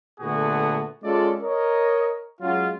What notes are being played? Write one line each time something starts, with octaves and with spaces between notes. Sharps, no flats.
A#2 D3 A3 B3 F#4 G#4
G#3 C#4 F4 A4 D5
A#4 C#5 D#5
F#3 G#3 C#4 F4